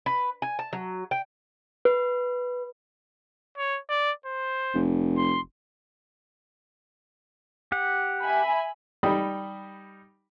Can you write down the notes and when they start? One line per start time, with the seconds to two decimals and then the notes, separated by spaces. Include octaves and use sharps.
0.06 B4
0.42 G#5
0.59 A5
0.73 F#3
1.11 G5
1.85 B4
3.58 C#5
3.89 D5
4.26 C5
4.74 F1
5.17 C6
7.72 G4 F#5
8.23 E5 G#5 B5
9.03 G3 D#4 G5 B5 D#6